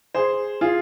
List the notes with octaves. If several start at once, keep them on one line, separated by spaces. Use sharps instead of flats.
G#4 C5
F4 G#4